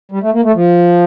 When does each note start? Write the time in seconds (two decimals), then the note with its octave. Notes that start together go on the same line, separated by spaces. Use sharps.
0.12 G3
0.23 A3
0.34 A#3
0.44 A3
0.55 F3